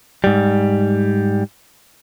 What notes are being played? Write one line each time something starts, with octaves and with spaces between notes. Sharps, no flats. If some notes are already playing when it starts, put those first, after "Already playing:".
G#2 G3